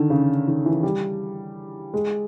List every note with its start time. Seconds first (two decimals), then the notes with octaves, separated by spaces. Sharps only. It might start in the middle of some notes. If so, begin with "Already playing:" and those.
Already playing: D3 D#3
0.10 C#3
0.48 D#3
0.66 E3
0.83 G3
1.94 G#3